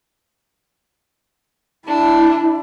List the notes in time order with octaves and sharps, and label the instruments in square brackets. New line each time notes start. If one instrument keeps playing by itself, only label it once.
[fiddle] D4 [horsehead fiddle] E4